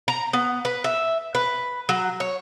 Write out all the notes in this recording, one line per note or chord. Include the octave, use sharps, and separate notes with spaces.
A#5
B3
B4
E5
B4
F#3
C#5